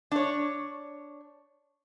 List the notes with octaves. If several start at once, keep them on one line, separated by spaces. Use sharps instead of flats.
D4 C#5